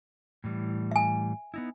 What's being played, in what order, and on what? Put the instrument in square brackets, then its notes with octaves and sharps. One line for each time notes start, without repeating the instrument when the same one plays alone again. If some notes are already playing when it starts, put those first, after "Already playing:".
[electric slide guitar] A2 E3 G3
[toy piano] E5 G#5
[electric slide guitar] B3 D#4 E4